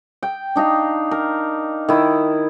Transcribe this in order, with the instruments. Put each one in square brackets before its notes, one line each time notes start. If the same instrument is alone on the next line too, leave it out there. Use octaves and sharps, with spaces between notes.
[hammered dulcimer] G5
D4 D#4 F5 A#5
A#4
D#3 E4